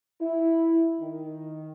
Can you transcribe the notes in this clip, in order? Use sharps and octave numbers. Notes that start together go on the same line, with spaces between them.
E4
D#3